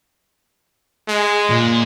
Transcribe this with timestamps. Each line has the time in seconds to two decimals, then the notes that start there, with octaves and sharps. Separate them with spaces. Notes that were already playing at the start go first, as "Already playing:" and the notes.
1.08 G#3
1.50 A#2